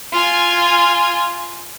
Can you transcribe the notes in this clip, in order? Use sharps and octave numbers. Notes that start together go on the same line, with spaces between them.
F4 G#5